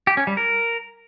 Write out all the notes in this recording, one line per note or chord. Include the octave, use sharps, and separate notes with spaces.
G4
C#4
G3
A#4